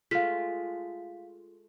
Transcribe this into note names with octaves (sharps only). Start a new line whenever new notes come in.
G#3 A3 F4 F5 B6